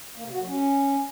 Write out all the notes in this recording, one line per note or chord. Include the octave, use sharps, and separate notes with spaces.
A#3
C3
F#4
F#3
C#4